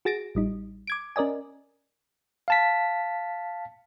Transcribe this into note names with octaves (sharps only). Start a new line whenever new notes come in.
F#4 G#4 A6 A#6 D7
A1 G3 D#4
D6 G#6 D7
C#4 A#4 D5 D#5 G#5
F5 A5 B6